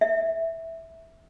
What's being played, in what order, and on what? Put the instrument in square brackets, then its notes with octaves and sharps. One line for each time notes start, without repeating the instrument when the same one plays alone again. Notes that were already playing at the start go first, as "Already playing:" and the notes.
[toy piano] E5